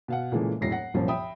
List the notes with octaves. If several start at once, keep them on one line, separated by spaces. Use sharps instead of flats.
B2 F5 F#5
A#2 C#3 E3 G#3 A3
E1 A2 F#3 A#6 C7
F#5 A#6
G1 C2 F#2 A#2 F3
E5 G5 B5 D#6